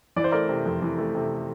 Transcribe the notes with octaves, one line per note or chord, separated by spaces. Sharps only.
E3 D5
C5
A3 A#4 D5
C3
F2
E3
A3
C3